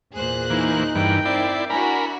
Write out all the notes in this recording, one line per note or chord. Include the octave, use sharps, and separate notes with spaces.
E2 A#2 G#4 C5 F#6
E3 A#3 D#4
G2 E3 A#4 G5
C4 E4 D5 C7
D4 E4 F#4 A#4 G#5 B5